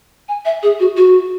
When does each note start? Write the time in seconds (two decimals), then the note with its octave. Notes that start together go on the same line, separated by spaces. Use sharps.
0.28 G#5
0.45 E5
0.63 G#4
0.80 F#4
0.97 F#4